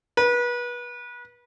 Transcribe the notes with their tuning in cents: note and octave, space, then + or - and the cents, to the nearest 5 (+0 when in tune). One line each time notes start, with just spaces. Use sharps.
B4 -30